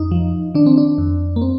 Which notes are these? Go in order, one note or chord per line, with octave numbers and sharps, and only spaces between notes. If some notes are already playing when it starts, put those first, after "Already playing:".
Already playing: F2 D#4
F3
D#3 D4
C4
D4
F2
A#3
C4